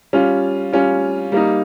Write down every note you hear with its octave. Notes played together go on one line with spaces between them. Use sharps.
G3 C#4 F4
G3 C#4 F4
G3 A#3 D#4